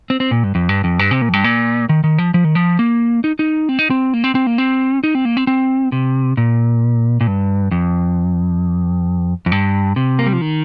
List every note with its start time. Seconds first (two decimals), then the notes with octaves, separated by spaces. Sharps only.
0.10 C4
0.20 C4
0.31 A#2
0.44 G2
0.55 F2
0.69 G2
0.84 F2
0.99 G2
1.11 C3
1.22 A#2
1.29 F2
1.33 G2
1.44 A#2
1.89 D#3
2.04 D#3
2.18 F3
2.34 F3
2.44 D#3
2.55 F3
2.79 A#3
3.24 D#4
3.39 D#4
3.69 C4
3.79 D#4
3.90 C4
4.14 A#3
4.24 C4
4.35 C4
4.47 A#3
4.58 C4
5.04 D#4
5.15 C4
5.25 A#3
5.37 C4
5.47 C4
5.92 C3
6.37 A#2
7.21 A#2
7.27 G2
7.71 F2
9.46 F2
9.52 G2
9.96 C3
10.19 A#3
10.26 G3
10.33 F3
10.41 D#3